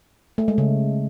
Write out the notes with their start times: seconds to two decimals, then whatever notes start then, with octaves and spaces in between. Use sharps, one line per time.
0.38 A3
0.48 G#3
0.58 C#3